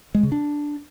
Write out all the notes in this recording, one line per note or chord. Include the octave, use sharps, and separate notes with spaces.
G#3
C#3
D4